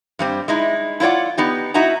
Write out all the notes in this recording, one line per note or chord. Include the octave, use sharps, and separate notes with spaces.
G2 G3 C4
G#3 D#4 E4
E4 F4 C#5 D5 F#5
B3 D#4 G4
D#4 E4 F#4 E5 F#5 A#5